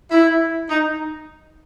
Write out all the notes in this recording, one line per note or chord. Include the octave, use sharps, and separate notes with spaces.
E4
D#4